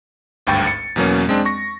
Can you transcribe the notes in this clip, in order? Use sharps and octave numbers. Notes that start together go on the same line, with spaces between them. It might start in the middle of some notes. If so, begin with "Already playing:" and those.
G#1 D2 G2 G5 C#6 A6
C#7
E2 B2 F#3 A#3 C#4
G#3 C4 D4
C#6 A#6